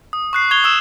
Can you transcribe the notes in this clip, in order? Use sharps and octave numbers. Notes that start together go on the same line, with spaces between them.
D#6
C#6 F#6 C7
C#6 G#6 F7 G7
D#6 E6 E7